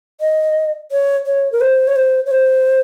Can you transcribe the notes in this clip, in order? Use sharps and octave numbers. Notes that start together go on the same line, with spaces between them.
D#5
C#5
C#5
A#4
C5
C#5
C5
C#5
C5